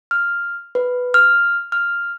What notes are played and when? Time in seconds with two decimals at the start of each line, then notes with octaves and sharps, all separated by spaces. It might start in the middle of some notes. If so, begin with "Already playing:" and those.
0.11 F6
0.75 B4
1.14 F6
1.72 F6